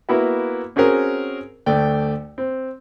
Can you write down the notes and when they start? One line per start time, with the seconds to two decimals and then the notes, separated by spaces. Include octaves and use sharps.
0.09 A#3 B3 E4 F#4
0.76 C4 C#4 F#4 G#4 A#4
1.66 D2 A3 D5 G5
2.38 C4